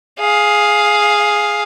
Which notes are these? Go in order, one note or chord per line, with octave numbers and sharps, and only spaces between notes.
G#4 F5